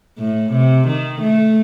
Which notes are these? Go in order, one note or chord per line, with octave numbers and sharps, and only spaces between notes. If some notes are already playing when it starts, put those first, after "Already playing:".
A2
C3
D#3
A3